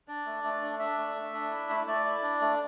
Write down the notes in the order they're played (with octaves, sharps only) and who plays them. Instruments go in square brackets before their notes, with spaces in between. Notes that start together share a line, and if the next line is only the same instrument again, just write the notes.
[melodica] D4 D5
A3
A3
D4
D4 E5
A3
A3
D4
E4
A3
A3 D5
E4
D4
A3